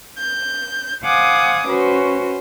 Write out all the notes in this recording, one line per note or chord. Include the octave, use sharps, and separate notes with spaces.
G6
C5 F5 F#5 G#5 D6 D#6
C#4 F#4 B4 C5